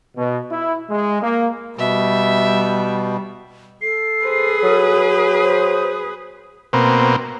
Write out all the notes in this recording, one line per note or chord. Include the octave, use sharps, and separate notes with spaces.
B2
E4
G#3
A#3
B2 G3 E5
A4 C7
G#4 B4 C5
F#3 D#6
C5
B2 A#3 C4